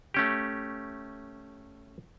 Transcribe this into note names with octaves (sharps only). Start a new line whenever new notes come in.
A3 C#4 G4